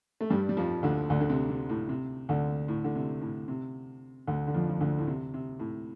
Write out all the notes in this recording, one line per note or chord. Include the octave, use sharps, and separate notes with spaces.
A3
G2 G3
G3
F2 F3
D2 D3
D2 D3
D3
C3
C3
A2
C3
D2 D3
A2
D3
C3
A2
C3
D2 D3
D3
F2 F3
F3
D2 D3
A2
C3
C3
A2